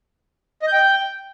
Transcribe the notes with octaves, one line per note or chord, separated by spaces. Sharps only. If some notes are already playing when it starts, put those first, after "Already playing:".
D#5
G6
G5